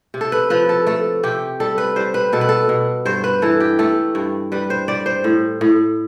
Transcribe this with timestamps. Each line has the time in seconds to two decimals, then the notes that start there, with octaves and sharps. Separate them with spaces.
0.14 C3
0.21 A4
0.32 B4
0.50 F3 B4
0.69 A4
0.87 A3 A4
1.23 C3 G4
1.60 G3 A4
1.78 B4
1.96 G3 C5
2.14 B4
2.33 B2 A4
2.41 B4
2.49 A4
2.69 B2
3.05 G2 C5
3.24 B4
3.42 E3 A4
3.60 G4
3.79 A3 A4
4.15 G2
4.52 G3 B4
4.70 C5
4.88 G3 D5
5.06 C5
5.24 A2
5.61 A2